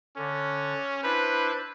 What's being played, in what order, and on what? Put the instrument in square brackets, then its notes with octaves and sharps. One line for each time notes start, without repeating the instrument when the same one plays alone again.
[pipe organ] D3 [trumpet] C#4
[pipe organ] D4 E4 C5 [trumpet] B4